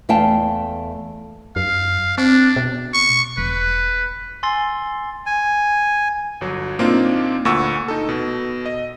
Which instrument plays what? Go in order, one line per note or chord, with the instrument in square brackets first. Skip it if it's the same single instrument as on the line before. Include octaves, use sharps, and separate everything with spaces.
[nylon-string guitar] E2 A3 F5 G5 A5
[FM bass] F#2 [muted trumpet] F5
[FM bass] C4 [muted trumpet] D4
[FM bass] B2
[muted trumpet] C#6
[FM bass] E1 [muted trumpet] B4
[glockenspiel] G#5 C6 E6 A6 C7 G7
[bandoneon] G#5
[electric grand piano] G1 F#3
A#2 A#3 C4 D4 D#4 F4
D2 A#2 F#5 C#6 E6
D#4 A4
B2
D#5